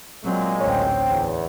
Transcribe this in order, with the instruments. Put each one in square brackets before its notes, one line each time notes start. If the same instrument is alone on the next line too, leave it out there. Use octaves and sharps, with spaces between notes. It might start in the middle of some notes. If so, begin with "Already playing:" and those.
[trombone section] A#2 G#3 [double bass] F#3 C4
[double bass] A1 D2 [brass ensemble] C4 C5 G5 [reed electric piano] C#5
[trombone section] E2